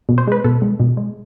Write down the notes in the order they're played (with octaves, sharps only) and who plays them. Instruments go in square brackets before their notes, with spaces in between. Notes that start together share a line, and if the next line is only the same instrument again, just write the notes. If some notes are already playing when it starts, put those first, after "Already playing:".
[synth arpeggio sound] B2
C5
G#3 B4
B2 A4
G#3
B2
G#3